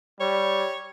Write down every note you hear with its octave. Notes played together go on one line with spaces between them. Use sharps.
G3 C#5